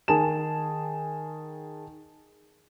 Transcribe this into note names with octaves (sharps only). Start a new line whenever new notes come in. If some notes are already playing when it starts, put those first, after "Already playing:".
D#3 G#4 A5 E7